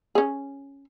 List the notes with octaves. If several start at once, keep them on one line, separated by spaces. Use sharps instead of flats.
C#4 G#4